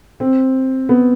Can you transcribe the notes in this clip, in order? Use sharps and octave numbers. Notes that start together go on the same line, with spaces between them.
C4
B3